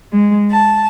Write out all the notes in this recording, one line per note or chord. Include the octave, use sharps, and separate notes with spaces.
G#3
A5